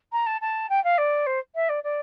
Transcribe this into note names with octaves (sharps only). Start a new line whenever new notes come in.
A#5
A5
A5
G5
F5
D5
C5
E5
D5
D5